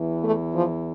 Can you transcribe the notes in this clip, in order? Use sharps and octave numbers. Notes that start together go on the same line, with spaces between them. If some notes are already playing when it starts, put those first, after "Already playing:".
Already playing: E2 E3
A3
F3